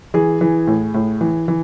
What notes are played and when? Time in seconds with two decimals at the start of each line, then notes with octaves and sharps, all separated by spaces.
0.14 E3 G#4
0.41 E3
0.67 A2
0.94 A2
1.21 E3
1.48 E3